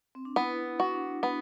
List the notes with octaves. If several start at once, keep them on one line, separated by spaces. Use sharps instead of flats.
C4
D4
B3 E4
E4
F#4
D4
B3 D4